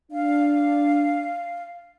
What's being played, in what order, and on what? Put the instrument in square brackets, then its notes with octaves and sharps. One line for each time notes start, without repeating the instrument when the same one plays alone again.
[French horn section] D4 [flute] F5